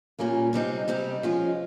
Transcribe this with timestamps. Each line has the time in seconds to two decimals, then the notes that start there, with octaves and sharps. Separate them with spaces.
0.19 A#2 G3 A#3 C#4 F4
0.53 C3 G3 C4 D#4 G4
0.88 C3 G3 C4 D#4 G4
1.23 F3 G#3 C#4 F4